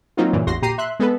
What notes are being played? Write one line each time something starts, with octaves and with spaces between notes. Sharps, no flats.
F#3 A#3 C4 D#4 F4
G2 A#2 C#3 E3
A1 E2 F#4 C6 A#6
A#2 G4 A#5 C7 D#7
E5 C6 F#6
G#3 B3 A4 B4